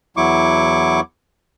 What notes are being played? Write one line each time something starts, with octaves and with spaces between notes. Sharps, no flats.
E2 F#3 E4 C#6 D6